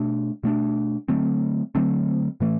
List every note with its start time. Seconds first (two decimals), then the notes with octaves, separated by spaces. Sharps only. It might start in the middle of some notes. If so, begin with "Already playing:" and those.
Already playing: B2 A3 D4
0.43 B2 A3 D4
1.08 D3 F#3 A3 C4
1.75 D3 F#3 A3 C4
2.40 A2 E3 A3